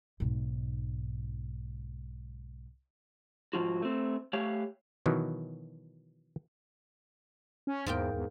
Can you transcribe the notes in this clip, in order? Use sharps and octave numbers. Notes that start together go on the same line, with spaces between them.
B1 G#2
G#2 F3 F4 F#4
A3 C4
A3 G4 C#5 F5
B2 D#3 E3 F#3
C#4
E2 G#2 A#3 G5
E2